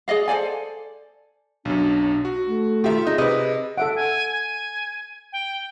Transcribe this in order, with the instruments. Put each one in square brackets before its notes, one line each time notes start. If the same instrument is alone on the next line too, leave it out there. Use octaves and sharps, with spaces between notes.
[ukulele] G#4 D5 D#5 F5
A4 C5 D5 G#5
[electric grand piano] B1 F#2 [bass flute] D4
[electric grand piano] F#4
[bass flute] A3
[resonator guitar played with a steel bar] D#3 G4 [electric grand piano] F4 E5
[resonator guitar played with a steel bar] D#4 [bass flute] G#4
[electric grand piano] C3 [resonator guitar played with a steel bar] B4 D#5
[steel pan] A4 E5 F#5 [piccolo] D7
[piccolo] G#5
G#5
G5